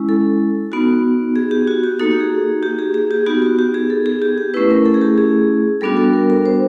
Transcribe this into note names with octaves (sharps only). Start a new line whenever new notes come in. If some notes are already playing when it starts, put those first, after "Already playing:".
Already playing: G#3 C#4 E4
A4
B3 D#4 F#4
G#4
G4
F#4
G4
A#3 D#4 F#4 A4
G4
G#4
G4
G#4
G#4
G4
B3 D#4 F#4 G4
F#4
G4
G#4
A4
G#4
G4
G4
A3 C#4 E4 B4
A#4
A4
G#4
G4
G#4
G3 B3 D4 F#4 A4
A4
A#4
A#4
C5